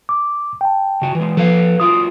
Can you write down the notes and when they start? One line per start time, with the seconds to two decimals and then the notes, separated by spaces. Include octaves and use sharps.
0.09 D6
0.61 G5 A5
1.02 C#3 F#4
1.15 E3 G#3
1.37 F3 A4 B4 F5
1.80 F#3 F4 A#4 D#6